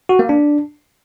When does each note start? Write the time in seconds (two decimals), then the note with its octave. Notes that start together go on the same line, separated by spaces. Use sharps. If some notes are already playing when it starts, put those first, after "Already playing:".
0.09 F#4
0.19 A#3
0.29 D4